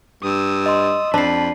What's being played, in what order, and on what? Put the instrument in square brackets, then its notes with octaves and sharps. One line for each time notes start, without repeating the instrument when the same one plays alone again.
[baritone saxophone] G2 [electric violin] D#6 E6
[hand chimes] D#5 C6
[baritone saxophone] F2 [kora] D4 [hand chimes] A5 C7 [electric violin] B5